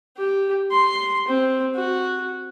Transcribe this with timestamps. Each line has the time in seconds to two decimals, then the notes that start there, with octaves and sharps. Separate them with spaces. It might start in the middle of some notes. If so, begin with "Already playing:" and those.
0.18 G4
0.72 C6
1.28 C4
1.75 F#4